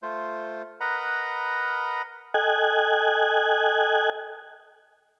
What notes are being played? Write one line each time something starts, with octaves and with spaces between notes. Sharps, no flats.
A3 F4 C5
A#4 B4 D#5 F#5 A#5 B5
A4 D#5 G5 G#5 F#6 G#6